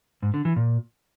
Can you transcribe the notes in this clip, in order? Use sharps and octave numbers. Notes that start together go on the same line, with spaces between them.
G#2
D3
E3
A#2